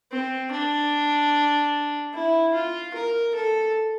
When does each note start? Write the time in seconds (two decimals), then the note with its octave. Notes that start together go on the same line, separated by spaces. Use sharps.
0.11 C4
0.52 D4
2.14 E4
2.54 F4
2.94 A#4
3.35 A4